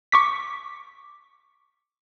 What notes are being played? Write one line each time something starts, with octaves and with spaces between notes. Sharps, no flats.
C#6 D6 B6